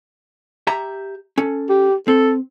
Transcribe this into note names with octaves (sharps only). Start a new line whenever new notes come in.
G4 E5 A#5
C#4 A4
G4
C4 A4